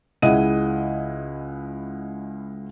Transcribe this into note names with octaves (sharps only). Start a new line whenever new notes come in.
C#2 E4 G#4 D#5 F#5 D#7